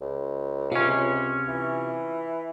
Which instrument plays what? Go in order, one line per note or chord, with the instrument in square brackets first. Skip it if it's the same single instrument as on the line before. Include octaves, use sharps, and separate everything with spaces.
[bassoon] C#2
[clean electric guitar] C3 C#4 [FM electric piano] F4
[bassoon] E3